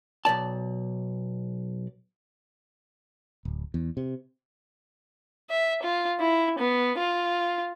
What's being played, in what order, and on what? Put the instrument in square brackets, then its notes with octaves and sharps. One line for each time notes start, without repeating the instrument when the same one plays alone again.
[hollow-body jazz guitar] B1 F#3 D5 A5
[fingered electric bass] D1
E2
C3
[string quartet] E5
F4
E4
B3
F4